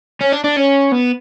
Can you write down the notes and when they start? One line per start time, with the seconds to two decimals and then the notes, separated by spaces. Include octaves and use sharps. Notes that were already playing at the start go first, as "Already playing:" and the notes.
0.21 C#4
0.32 D4
0.44 D4
0.57 C#4
0.92 B3